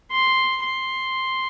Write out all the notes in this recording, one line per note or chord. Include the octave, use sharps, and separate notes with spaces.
C6
C6